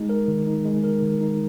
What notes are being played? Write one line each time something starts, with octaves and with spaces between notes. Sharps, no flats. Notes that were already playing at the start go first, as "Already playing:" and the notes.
Already playing: G#3 D#4
A#4
D#3
D#4
G#3
A#4
D#3
D#4